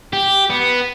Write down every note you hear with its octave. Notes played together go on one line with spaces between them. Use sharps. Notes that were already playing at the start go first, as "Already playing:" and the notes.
G4
B3